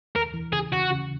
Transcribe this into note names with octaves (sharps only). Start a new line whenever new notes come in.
D#2 A#4
E3
C#3 G#4
C#3 F#4
C#3